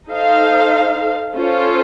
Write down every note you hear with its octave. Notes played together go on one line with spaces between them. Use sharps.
D#4 A4 C5 F5
C#4 F4 A4 C5